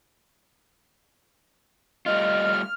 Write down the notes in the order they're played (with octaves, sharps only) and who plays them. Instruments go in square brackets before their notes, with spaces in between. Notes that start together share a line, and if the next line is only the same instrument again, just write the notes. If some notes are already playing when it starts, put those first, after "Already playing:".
[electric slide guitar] G3 A3 F4 [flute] D#5 [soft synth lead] F6